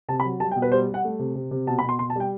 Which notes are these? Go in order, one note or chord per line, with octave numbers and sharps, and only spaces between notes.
C3 A5
B5
F#3
G3 A5
G5
B2
B4
G3 C5
G3
F#5
A3
C3
C3
C3
B2 A5
B5
B2
C6
B2 C6
A5
G3 G5